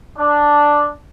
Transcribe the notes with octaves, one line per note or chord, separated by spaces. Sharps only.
D4